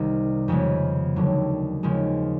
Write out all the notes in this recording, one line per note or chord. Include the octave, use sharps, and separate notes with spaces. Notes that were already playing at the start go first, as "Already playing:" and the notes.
Already playing: C2 C3 D#3 G3
F2 C#3 F3 G#3 B3
D#2 D3 F#3
D#2 C#3 F3 G#3